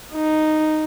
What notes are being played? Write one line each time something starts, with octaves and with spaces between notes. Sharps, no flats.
D#4